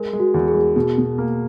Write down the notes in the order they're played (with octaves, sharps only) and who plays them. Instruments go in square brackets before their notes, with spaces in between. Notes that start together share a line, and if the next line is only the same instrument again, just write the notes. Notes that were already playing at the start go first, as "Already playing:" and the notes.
Already playing: [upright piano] G#3 [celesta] A#4
[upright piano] G#3
[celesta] F#4
[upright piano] E2
[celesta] G#4
[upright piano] G#3
[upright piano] B2 [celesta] G#4
[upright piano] B2
A#3